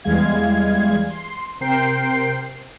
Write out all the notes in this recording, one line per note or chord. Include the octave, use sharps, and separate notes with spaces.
E2 E3 G3 G#3 F5 G#6
C6
C3 A#4 C5 G5 C7